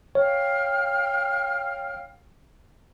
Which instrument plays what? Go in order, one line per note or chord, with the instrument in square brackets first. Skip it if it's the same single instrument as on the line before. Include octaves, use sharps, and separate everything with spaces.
[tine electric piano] C#5 [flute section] F5 G5 F6